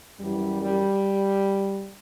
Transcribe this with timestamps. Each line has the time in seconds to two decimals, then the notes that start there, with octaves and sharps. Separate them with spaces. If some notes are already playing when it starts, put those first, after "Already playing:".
0.19 F#2 E3 G3
0.61 G3